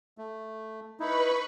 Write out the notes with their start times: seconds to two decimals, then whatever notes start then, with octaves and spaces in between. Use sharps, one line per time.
0.18 A3
1.00 D#4 E4 B4 B5 C#6